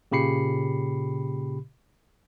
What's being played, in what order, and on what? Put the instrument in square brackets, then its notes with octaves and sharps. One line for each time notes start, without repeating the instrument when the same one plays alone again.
[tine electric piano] A#2 C#3 G4 B5 C7 C#7